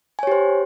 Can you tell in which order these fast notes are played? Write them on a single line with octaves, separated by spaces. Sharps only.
G#5 C#5 G4 C5